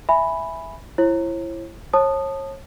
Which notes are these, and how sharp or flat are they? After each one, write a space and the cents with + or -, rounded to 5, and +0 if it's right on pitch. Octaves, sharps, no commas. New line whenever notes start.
E5 +0 G#5 +0 B5 +0
E4 +25 C#5 -45
C#5 -35 A5 +0 D#6 -20